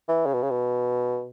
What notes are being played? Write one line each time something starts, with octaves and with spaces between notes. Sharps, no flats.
E3
C#3
B2
C#3
B2